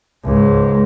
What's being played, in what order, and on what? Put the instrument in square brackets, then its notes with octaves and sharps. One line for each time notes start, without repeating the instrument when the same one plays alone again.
[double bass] C#2 G#2